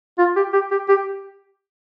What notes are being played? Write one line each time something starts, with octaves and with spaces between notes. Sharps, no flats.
F4
G4
G4
G4
G4